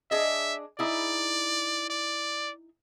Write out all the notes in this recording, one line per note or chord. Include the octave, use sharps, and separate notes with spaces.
D4 G#4 D#5 E5
D#4 E4 G#4 D5
D5